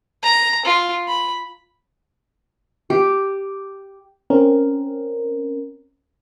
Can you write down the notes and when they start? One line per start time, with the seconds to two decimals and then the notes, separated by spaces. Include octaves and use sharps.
0.23 A#5
0.65 F4
1.08 B5
2.90 G4
4.30 C4 C#4 A#4